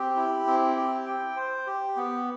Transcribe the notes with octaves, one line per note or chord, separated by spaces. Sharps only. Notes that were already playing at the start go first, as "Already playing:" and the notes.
Already playing: C4 G4
E4
C4
G4
G5
C5
G4
B3